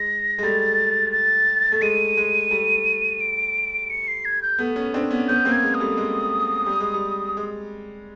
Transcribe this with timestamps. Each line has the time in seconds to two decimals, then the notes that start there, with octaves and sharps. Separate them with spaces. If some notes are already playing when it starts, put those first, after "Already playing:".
Already playing: G#3 A#6
0.38 G#3
0.43 G3 A3 A6
1.12 A6
1.72 A3
1.82 G#3 D#7
2.17 G#3
2.51 G3 A3
3.21 D7
3.90 C#7
4.08 C7
4.25 G#6
4.42 G6
4.59 A3 B3
4.76 B3 C#4
4.94 C4 D4
5.11 B3 C#4
5.28 B3 C#4 G6
5.45 A#3 C4
5.52 G#6
5.63 G#3
5.74 D#6
5.80 G3 A3
5.97 G#3
6.66 G3
6.80 G#3
6.94 G3
7.37 G#3